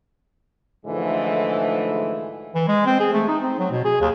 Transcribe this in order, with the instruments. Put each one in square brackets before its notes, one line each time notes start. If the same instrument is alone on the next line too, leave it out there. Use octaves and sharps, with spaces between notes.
[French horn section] G#2 D3 E3 F3 G#3 A3
[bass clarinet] E3
G#3
C4
G#4
A3
D#4
C4
F#3
B2
G#4
D#2